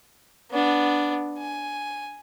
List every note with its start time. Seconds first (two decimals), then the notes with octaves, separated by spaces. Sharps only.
0.51 B3 D4
1.38 G#5